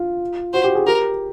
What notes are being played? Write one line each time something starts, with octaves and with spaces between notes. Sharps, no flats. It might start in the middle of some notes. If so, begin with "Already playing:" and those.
Already playing: F4
F#4 C5
G4
G#4
G4 A#4